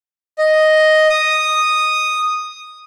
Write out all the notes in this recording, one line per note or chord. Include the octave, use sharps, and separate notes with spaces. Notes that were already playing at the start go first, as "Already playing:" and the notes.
D#5
D#6